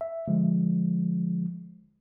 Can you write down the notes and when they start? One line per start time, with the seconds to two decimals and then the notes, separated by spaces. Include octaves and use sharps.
0.01 E5
0.28 D3 F3 G#3